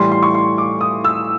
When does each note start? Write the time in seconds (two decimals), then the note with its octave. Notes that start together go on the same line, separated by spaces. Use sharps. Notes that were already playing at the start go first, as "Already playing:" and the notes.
Already playing: A2 E3 G3 C6
0.12 C6
0.23 C#6
0.34 C6
0.58 D6
0.81 D#6
1.04 E6